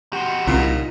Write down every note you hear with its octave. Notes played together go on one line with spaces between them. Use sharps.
E2 F#4 G4 C6
C2 A#2 D#4 F4 A#4